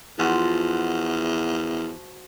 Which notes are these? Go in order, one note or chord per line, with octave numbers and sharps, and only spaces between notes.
E2 F3 F#4